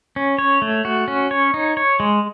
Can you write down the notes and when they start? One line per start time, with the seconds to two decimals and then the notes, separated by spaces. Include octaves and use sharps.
0.16 C#4
0.39 C#5
0.62 A3
0.85 F#4
1.08 C#4
1.31 C#5
1.54 D#4
1.77 C#5
2.00 G#3